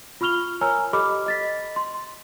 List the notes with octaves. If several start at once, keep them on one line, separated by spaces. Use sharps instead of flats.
F4 B5 C#6 F6 F7 G7
A#4 C#5 G#5 A#5 E6 F6
G4 A4 D#5 B5 D6 F6
D#5 A6 B6
C6